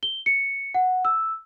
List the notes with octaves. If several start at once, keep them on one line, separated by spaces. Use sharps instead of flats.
G7
C#7
F#5
E6